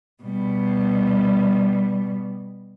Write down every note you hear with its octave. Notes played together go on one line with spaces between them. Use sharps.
B2 G3